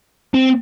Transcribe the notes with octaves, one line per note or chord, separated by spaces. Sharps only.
C4